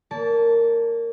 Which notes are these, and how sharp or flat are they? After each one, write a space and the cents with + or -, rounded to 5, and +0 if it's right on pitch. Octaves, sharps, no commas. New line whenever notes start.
A#3 -10 D5 -45 A5 +0